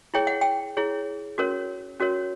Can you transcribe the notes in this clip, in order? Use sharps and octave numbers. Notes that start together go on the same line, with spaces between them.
E4 G#4 C#5 G5
F#5
G5
E4 G#4 C#5
C#4 F#4 A#4 C#5
C#4 F#4 A#4 C#5